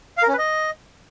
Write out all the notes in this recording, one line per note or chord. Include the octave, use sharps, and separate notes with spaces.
F5
A#4
C#4
B4
D#5